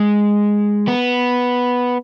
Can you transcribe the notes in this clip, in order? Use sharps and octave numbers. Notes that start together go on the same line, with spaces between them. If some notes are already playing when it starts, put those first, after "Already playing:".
Already playing: G#3
B3